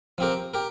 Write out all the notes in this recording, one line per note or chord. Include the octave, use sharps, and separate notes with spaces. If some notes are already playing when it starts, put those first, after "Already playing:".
F3 C4 G4 A#4
G4 A#4